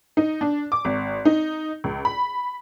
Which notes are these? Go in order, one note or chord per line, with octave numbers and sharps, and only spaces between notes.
D#4
D4
D6
G#1
D#4
C#2
B5